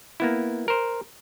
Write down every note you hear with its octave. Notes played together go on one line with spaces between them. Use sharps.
A#3 B3 E4
A#4 C5